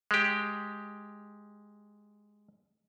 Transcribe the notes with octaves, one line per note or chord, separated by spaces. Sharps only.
G#3 G4